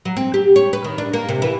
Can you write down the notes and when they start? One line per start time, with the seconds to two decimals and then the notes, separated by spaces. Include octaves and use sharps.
0.05 F#3
0.17 C4
0.34 G4
0.56 C#5
0.73 B4
0.84 D#3
0.98 D4
1.13 A#3
1.29 C3
1.42 E3